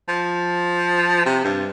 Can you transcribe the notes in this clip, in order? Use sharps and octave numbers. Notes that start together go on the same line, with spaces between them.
F3
C3
G2